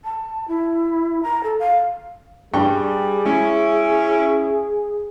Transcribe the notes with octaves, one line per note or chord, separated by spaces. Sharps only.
A5
E4
A#5
A4
F5
G2 G3 G#4 G5 C#6
G#3 C#4 E4